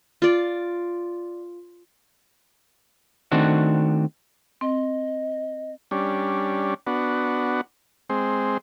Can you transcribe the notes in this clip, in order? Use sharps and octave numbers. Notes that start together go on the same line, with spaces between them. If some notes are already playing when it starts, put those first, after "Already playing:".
F4 D5
D#3 A3 C4 D4 F#4
C4 D#5
G3 C#4 D4
B3 D4 F#4
G#3 C4